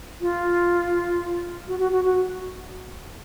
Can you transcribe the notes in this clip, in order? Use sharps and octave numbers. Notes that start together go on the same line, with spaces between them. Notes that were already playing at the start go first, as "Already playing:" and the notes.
F4
F#4
F#4
F#4
F#4